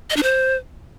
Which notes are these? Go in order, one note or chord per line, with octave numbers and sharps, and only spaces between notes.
D#5
D4
C5